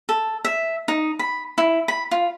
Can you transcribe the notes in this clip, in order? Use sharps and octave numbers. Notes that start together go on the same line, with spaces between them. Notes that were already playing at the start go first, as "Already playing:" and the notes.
A4
E5
D#4
B5
E4
B5
F4